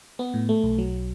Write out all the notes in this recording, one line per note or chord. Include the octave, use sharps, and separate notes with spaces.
B3
A2
A3
B1
F#3